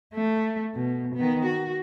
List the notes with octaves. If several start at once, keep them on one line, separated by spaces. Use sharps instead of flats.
A3
B2
D#3 B3
F#4